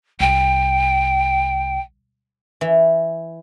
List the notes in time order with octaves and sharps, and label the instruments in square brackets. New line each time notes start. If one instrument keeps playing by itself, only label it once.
[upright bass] C2 [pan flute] G5
[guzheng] E3